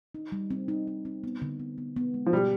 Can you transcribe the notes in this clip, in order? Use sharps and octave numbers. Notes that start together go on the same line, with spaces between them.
D#4
G3
C4
D#4
D#4
C4
B3
D3
B3
B3
B3
G#3
F3
B2 G3